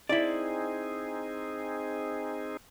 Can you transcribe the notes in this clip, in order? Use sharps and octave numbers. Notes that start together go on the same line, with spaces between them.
C4 D#4 E4 G#4 D5